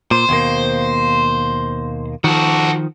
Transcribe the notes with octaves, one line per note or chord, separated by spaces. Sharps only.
A#2 C5
D#2 B2 A#3
D#3 F3 F#4 A4